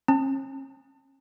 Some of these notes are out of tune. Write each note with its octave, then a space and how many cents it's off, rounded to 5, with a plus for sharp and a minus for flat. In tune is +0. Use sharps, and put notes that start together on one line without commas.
C#4 -45 A5 +30